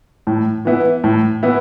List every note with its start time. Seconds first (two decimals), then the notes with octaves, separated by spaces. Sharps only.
0.27 A2
0.65 E3 B3 E4
1.04 A2
1.43 E3 B3 E4